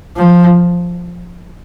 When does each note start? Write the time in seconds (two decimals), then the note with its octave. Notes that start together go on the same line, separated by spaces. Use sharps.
0.16 F3